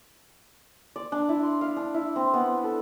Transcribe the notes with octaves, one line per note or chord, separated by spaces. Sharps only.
D5
D4
E4
C6
F5
D4
E4
C4
B3
A4